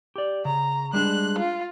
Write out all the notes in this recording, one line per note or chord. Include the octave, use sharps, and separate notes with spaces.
G4 D5
C#3 A#5
G3 G#3 D4 F#6
F4